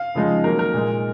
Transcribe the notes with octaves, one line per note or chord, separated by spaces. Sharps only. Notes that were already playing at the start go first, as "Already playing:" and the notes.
Already playing: F5
C#3 F3 G#3 D#4
D#3 F#3 A#3 A#4
A#4
A#2 G#3 D#4